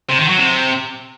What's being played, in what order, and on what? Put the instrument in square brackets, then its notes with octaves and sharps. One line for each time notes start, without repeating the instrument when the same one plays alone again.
[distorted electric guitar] C3
D#3
F#3
C3